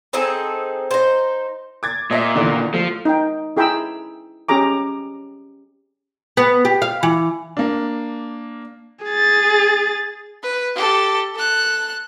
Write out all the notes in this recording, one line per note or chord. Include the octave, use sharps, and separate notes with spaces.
C4 D#4 G#4 A4
D#4 C5
D6 G#6 A6
A#2 D#5 E5
E2 D3 D#3
F3 A3
D#4 G5
E4 G#4 G5 A#5 B5 E6
C#4 G4 G#4 A#5 D6
B3
G4
F5
E3
A#3 D4
G#4 A6
B4
G4 A4
A4 F#6